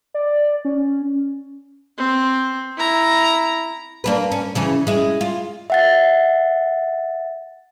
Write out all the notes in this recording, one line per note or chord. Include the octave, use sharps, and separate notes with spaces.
D5
C#4
C4
E4 A#5
A#3 D4 B4
C#4
C#3 E3 C#4
G#3 E4
F4
E5 F#5 A6